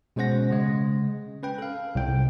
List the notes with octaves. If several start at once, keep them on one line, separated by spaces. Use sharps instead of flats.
B2 G#3 C#4 C5 F#5 A#6
C#3 G#3
C#4 B4 G5
A4 F5
C2 G5